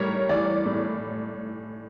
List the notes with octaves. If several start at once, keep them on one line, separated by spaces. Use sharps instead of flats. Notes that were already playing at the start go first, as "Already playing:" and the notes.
Already playing: A2 G3 A#4 C#5
E3 D5
A2